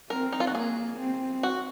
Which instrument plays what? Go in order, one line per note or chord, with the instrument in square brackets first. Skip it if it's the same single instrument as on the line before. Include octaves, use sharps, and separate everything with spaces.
[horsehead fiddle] C4 [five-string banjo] A#4
[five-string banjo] D#4
F4
F#4
[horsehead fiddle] A#3 [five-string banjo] G#4
[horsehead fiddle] C4
[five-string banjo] F#4